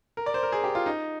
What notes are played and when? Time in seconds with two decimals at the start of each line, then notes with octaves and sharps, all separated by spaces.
0.17 A#4
0.26 D5
0.34 C5
0.43 A#4
0.52 G#4
0.64 G4
0.75 F4
0.86 D#4